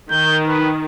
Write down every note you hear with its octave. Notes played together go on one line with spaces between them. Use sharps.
D#3 G6
B4